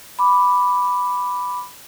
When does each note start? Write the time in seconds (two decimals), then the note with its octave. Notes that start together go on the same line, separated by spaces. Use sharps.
0.19 B5 D6